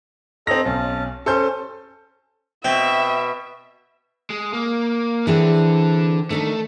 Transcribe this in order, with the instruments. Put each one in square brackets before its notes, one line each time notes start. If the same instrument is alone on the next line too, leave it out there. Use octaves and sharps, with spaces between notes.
[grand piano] C4 A#6 [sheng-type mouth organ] A4 D#5 A#5
[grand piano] B1 [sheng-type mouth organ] C#4 A5
[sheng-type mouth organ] C#4 [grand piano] A4 C5 G6
[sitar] B2 [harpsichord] C4 [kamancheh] E5
[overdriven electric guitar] G#3
A#3
[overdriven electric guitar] D3 D4 [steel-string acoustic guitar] E3 C4 G#4
[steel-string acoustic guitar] D#3 D4 D#4 [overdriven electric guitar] A3